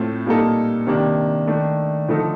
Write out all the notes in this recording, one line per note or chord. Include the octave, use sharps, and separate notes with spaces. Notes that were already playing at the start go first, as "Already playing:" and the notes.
Already playing: A2 A3 C4 F4
A#2 G3 A#3 D#4 A4
C3 D#3 A#3 D4 G4
D#3 A3 D4
D3 F3 A3 D#4 A4